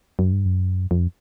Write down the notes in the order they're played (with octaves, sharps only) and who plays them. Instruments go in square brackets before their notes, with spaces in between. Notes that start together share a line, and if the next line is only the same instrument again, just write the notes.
[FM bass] F#2
G2
F#2
F2